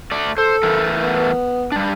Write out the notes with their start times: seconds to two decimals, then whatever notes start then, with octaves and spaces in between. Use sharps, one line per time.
0.11 A3 D5
0.38 A4 C5
0.63 E3 A3 A#4
1.03 B3
1.72 G3 D4